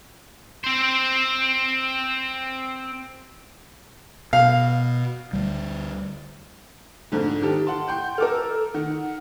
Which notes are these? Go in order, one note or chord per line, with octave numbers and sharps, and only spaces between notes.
C4 C5
B2 F5
D2 G3
F2 G#2 D3
D#3 G4 A4
F#5 A5 C6
F#5 G5 C6 G6
A4 A#4 D6 F6
D#3 F#5